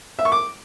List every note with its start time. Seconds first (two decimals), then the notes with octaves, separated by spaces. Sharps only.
0.19 E5
0.25 C#6
0.32 D6